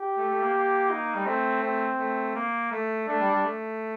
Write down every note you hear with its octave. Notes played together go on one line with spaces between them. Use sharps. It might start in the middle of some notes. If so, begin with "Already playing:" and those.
Already playing: G4
A3
A3
A#3
A#3
D#4
G3
A3 C4
C4
A3
A#3
A3
A3 D4
G3
G3
A3